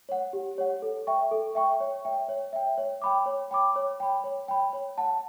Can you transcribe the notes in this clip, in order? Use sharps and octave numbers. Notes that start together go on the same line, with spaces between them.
C#5 F#5
G4
C#5 F#5
A4
E5 G5 C#6
A4
E5 G5 C#6
C#5
E5 G5
C#5
E5 G5
C#5
G5 B5 D6
C#5
G5 B5 D6
C#5
G5 B5
C#5
G5 B5
C#5
F#5 A5